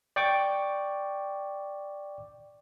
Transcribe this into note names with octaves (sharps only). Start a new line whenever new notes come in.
D5 G5 C#6 D6